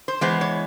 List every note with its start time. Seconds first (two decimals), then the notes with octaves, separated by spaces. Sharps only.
0.08 C5
0.21 E3 G#3 B3 C5
0.41 C#5